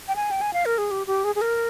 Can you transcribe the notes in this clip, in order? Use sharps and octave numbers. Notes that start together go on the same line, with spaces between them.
G5
G#5
G5
G#5
F5
A#4
G#4
G4
G4
G#4
G#4
A#4